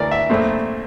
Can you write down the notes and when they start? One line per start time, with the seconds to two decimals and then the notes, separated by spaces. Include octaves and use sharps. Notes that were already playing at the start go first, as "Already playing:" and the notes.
Already playing: D2 E3 A#4 D5
0.11 E5
0.30 A#1 A#2 A3 C4